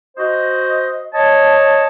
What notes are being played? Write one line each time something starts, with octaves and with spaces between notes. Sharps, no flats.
F#4 C5 D#5
C#5 D#5 A5